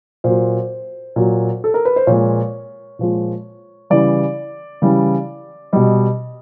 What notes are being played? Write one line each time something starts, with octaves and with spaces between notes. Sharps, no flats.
A#2 F#3 C5
A#2 F#3
A4
A#4
B4
C5
A#2 F3 G#3 C#5
A#2 F3 G#3
C#3 E3 G3 D5
C#3 E3 G3
B2 G3 D#5